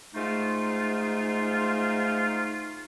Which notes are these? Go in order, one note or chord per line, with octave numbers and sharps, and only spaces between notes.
G#2 A3 D#4 F4